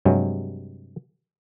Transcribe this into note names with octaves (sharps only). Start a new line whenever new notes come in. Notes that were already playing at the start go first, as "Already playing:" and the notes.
G2 C3 F#3 G#3